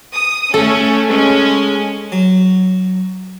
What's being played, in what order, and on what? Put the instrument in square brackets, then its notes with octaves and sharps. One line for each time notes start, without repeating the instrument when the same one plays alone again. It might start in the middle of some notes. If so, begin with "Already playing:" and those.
[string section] D#6
[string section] A3 C#4 [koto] A4
[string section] G#3 C#4
[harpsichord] F#3